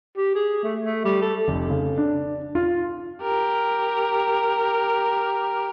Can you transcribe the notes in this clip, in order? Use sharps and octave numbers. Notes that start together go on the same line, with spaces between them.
G4
G#4
A3
A3
G3
A4
F1
C#3
D4
F4
G4 A#4